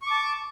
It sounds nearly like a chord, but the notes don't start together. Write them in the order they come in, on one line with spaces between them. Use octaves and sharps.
C#6 D6 A5